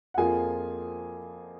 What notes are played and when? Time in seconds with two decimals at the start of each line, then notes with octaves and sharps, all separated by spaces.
0.14 F#5
0.17 F2 F3 A#3 F4 G#4 G#5